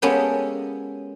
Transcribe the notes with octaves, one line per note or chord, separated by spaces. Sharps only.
G#3 A#3 B3 C#4 G4 A4